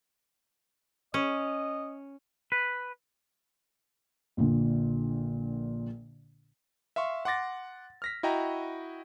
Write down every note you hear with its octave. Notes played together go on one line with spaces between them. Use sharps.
C#4 D#5
B4
A#1 A#2 D3
E5 F5 C6 C#6
F#5 C6 D6 A6 A#6
F6 A#6 B6
E4 F#4 D#5 G5 A#5